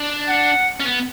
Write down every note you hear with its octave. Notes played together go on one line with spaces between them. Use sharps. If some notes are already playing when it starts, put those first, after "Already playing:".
Already playing: D4
F#5
C#4
B3